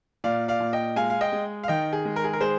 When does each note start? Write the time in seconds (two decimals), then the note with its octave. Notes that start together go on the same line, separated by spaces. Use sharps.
0.24 A#2 D5 F5
0.48 D5 F5
0.60 A#2
0.73 D#5 G5
0.96 G#3 F5 G#5
1.10 F5
1.21 D#5 G5
1.32 G#3
1.64 F5
1.68 D#3 D#5 G5
1.93 G#4
2.05 G#3
2.16 A#4
2.24 G#4
2.33 A#4
2.40 G#3 G#4 C5